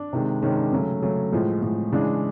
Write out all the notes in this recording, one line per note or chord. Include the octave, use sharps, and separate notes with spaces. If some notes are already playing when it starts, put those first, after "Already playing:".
Already playing: D4
C3 D#3 G#3
C3 D#3 G#3 C#4
D4
C#3 F#3 A3 C#4
C#3 F#3 A3
A2 F3 G#3
A2 F3 G#3
C#3 E3 G#3 D4